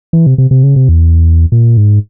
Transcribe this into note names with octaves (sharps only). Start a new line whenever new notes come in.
E3
C3
C3
C3
C#3
C3
E2
A#2
G#2